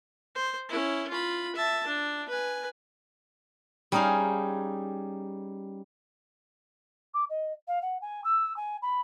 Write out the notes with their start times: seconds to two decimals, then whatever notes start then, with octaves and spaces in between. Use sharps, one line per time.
0.35 C5
0.69 C#4 E4
1.10 F4 B5
1.56 E5 A5
1.87 D4
2.29 B4 G#5
3.92 G3 C#4 D#4 G#4 F5
7.14 D6
7.29 D#5
7.67 F5
7.81 F#5
8.01 G#5
8.24 E6
8.56 G#5
8.82 B5